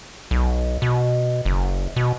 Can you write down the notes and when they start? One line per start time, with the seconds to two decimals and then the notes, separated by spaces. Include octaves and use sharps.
0.31 B1
0.82 B2
1.46 F#1
1.96 B2